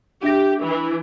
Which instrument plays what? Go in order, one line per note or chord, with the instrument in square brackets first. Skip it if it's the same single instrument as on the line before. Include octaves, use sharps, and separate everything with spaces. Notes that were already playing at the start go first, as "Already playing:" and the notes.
[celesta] D4 E5 A#6 [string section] G4
[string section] E3